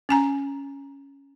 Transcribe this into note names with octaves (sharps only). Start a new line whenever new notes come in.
C#4 G#5 A#5